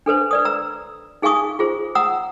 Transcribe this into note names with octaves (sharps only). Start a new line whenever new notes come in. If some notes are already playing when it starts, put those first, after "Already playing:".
D4 A4 B4 C5
B4 D5 D#6
A#5 E6
D#4 G#4 F5 G#5 C#6 D#6
F4 G#4 C5
F#5 A#5 D#6 E6